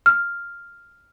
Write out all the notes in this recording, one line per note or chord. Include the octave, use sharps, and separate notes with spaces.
F6